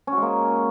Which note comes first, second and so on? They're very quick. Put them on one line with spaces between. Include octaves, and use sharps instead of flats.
C#4 F#4 G#3 A#3